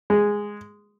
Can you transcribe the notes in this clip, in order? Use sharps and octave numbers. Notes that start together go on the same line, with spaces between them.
G#3